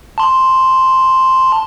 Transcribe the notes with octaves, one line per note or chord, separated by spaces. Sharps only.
A5 C6